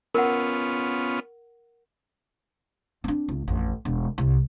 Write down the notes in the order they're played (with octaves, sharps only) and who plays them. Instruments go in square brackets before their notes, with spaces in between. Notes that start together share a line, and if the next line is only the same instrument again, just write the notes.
[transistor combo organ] B3 C#4 F4 [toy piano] A#4 F#5
[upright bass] C4 D4
C#2
A1 F2
E1
C2